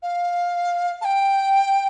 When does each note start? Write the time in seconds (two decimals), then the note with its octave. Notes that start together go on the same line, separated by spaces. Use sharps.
0.03 F5
1.01 A5
1.04 G5